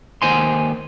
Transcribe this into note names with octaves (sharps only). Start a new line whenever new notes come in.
D#2 C5 G#5 C6